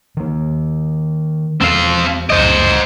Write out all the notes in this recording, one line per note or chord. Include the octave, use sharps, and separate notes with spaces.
D#3 A#3
E2 G#3 C4 F5
G1 C#2 F#2 C5 D#5